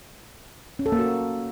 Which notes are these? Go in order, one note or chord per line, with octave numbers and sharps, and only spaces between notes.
C#4
A4
A#3
F#4